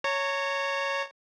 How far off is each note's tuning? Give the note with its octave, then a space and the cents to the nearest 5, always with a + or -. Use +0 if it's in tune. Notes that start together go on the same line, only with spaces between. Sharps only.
C#5 +0 A#5 -30